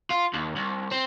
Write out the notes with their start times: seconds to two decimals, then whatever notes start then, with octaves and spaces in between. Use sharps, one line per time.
0.10 F4
0.33 D#2
0.56 C2
0.91 C4